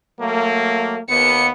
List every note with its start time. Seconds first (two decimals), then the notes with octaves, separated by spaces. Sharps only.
0.21 F#3 A3 A#3
1.09 D#2 B3 C#7